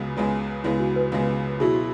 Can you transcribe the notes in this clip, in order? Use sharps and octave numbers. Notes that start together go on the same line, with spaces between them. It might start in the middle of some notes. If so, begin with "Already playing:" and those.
Already playing: C#2 C#3 G#3 B3 F#4
C#2 C#3 G#3 B3
C#2 C#3 G#3 B3 E4
F#4
B4
C#2 C#3 G#3 B3
B2 F#3 E4 G#4
F#4